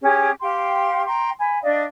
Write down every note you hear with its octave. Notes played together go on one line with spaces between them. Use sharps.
C#4 G4 G#4
G4 F5 G5 C6
G5 A#5 C6
G#5 B5
D4 D5 D#5 F5